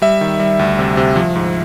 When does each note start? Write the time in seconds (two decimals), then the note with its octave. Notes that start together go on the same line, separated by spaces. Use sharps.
0.02 G3 E5
0.21 D#3
0.40 G3
0.59 D2
0.79 C3
0.97 C3
1.16 F3
1.35 G#2